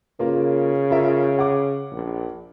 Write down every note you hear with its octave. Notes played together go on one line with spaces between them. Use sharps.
C#3 A#3 F4 A#4
F4 A#4 E5
F#5 D6
A#1